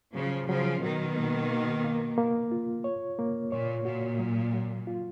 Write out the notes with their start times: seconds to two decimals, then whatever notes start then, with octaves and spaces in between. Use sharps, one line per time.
0.15 C#3 F3 F#3
0.49 C#3 F3 F#3
0.83 B2 D#3 F#3
1.17 A#3
1.50 A#3
1.84 A#3
2.18 A#3
2.52 F4
2.84 C#5
3.19 A#3
3.52 A#2 C#5
3.85 A#2 F#4
4.19 F#3
4.54 F#3
4.87 F4